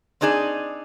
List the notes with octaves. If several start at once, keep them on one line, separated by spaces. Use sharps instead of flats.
C4 D4 D#4 G#4 D5